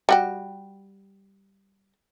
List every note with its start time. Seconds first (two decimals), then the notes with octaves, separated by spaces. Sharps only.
0.09 G3 F#4 G4